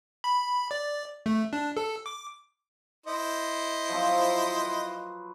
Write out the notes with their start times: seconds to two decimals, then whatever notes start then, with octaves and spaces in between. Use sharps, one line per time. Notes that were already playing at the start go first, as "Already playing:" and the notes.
0.24 B5
0.71 D5
1.26 A3
1.53 D4
1.77 A4
2.06 D6
3.07 E4 C5 D#5
3.89 F3 F#3 C4
4.43 C6
4.61 B4